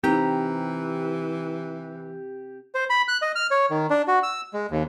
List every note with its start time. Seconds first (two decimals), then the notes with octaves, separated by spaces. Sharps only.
0.04 E3 C4 D#4 G4 A#5
2.75 C5
2.90 B5
3.08 F#6
3.22 D#5
3.35 F6
3.51 C#5
3.70 D#3
3.90 D4
4.08 F#4
4.23 E6
4.53 G#3
4.71 D#2